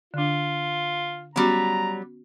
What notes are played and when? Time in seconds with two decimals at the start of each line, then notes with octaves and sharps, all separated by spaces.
0.14 D3 D4 F4
1.36 F#3 G3 B3 C#4 F#4 A#5